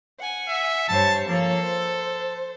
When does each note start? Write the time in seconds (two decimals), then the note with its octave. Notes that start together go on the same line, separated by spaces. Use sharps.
0.19 F#5 G#5
0.48 E5
0.89 G2 C5 C#5 A5
1.27 F3 A#3 A4 C#5
1.63 C5